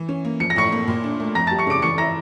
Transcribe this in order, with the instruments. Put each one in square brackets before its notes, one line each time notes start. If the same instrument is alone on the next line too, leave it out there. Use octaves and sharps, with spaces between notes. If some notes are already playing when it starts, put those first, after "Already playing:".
Already playing: [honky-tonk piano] E3
C#4
A#3
[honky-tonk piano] F3 [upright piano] C#7
[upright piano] A#6
[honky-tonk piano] A2 [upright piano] C#6 C#7
[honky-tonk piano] A#3
A#2
D4
A3
[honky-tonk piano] F2 [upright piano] A#5 A#6
[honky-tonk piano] G3 [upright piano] A5 A6
[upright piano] C#6 C#7
[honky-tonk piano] C#3 [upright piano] D6 D7
[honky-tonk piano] E3 [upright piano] C#6 C#7
[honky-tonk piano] E4 [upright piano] A#5 A#6